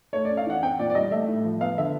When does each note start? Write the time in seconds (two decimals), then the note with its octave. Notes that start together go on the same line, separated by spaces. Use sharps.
0.13 A3 C#5
0.25 D5
0.29 C#4
0.37 F5
0.46 E3 F#5
0.63 C4 G5
0.79 A#2 D5
0.90 D5
0.95 G3 D#5
1.11 A3 E5
1.28 A2
1.44 F3
1.60 B3 F5
1.78 D3 E5